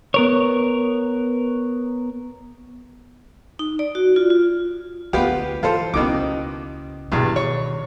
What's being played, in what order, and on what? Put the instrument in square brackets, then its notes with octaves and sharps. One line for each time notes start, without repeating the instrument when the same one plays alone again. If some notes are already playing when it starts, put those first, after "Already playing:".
[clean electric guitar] B3 A#4 C#5
[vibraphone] D#4
D5
F#4
F4
F4
[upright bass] D2 [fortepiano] B3 F4 G4
[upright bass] E3 [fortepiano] F4 A4 C5
[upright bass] C#2 E4 [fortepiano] B2 D#3 D6
[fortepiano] E2 G2 [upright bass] B2 D#3
[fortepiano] C#5